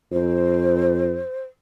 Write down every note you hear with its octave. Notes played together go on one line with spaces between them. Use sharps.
F2 C5